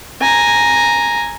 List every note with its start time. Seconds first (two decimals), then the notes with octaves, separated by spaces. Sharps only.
0.21 G#5 A#5